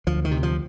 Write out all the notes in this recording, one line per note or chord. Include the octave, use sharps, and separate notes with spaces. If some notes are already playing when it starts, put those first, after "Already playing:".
D2 F3
D#3
C3
F3